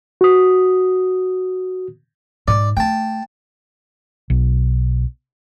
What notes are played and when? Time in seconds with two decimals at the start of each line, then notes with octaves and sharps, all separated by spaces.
0.21 F#4 D#6
2.48 G#2 D5
2.77 A3 G5 A5
4.30 B1